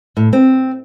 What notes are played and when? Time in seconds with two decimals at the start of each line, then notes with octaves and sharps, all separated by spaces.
0.17 A2
0.33 C4